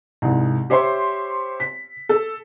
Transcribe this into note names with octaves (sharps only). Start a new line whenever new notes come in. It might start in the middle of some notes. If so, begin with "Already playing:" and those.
C2 G#2
G4 C5 C#5 E5 C6
B6
A4